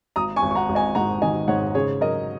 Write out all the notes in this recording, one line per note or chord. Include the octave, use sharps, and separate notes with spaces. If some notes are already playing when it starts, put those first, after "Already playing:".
G#1 A#5 D#6
G#5 C#6
G#1
C#6
F#5 A#5
G#1
D#5 G#5
G#2 F#5 A#5
D#3 D#5 G#5
G#2 C#5 F#5
C#3 G#4 C#5
F#3 A#4 D#5